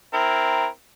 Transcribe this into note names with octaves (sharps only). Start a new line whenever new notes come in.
C4 E4 A#4